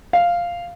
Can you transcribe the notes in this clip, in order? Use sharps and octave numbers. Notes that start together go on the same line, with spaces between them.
F5